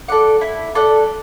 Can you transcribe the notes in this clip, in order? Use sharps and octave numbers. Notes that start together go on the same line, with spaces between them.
A4 D5 F#5
E4
A4 D5 F#5